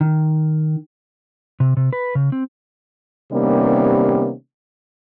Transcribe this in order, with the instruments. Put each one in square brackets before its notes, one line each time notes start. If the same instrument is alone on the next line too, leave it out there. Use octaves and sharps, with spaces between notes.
[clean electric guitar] D#3
[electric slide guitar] C3
C3
B4
C#3
C4
[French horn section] C3 D#3 G3 A#3 B3 C#4